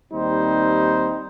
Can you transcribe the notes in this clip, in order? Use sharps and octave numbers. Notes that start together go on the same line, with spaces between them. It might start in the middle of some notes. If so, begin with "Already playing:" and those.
D#2 G3 C4 D#4 C5